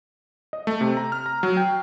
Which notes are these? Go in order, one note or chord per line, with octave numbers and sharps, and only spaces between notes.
D#5
A3
C3
A#5
F6
A#5
F#3
G5